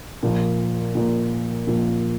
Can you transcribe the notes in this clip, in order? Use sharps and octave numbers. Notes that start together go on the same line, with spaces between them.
A#2 F3 A#3
A#2 F3 A#3
A#2 F3 A#3